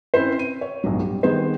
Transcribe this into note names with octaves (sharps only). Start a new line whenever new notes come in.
C4 C#4 E4 B4 C5
D#7
C#5
B1 G2 F#3
G3
D#3 G3 B3 G#4 C5